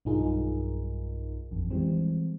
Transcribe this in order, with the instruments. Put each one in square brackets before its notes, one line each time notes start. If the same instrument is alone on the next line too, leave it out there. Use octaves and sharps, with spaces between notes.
[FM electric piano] B1 G2 D#4 F4 G#4 A#4
A1 F2
E3 G3 G#3 C4